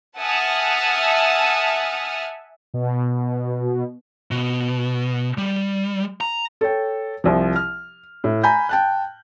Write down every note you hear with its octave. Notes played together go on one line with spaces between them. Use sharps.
E5 F#5 G#5 A5 D#6 F6
B2
B2
G3
A#5
A4 C#5 G5
C2 F3
F6
A2
G#5 A#5 B5 G6
G5 A5 F#6